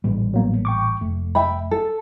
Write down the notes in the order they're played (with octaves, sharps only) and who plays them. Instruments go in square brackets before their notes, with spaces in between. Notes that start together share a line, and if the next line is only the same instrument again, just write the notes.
[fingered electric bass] A1 A#2 G3
[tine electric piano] F#3 A#3 B3
G5 C#6 D6
[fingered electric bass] F1 [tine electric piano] A3
[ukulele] E5 G5 B5
A4